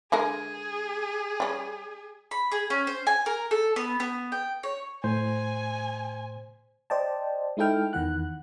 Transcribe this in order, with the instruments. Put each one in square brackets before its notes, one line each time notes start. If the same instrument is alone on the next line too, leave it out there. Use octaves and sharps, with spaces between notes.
[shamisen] D3 G#3 A#4 [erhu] G#4
[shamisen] G3 C#4
[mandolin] B5
G#4
C#4
C5
G#5
A#4
A4
B3
B3
G5
C#5
[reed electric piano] A2 [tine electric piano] C5 [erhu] G#5
[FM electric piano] C5 D5 D#5 G5 A5
G#3 D#4 E4 A4 G5 F6
E2 D#3 E3 F#5 F#6